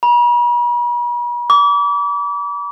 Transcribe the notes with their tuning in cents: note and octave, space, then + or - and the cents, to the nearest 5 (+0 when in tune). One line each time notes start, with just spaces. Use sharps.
B5 -45
D6 -35